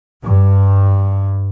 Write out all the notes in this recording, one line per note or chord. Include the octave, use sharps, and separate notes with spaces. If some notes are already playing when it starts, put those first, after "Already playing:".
G2